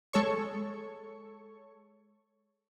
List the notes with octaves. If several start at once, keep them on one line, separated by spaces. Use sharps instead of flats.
G#3 A4 C#5 C#6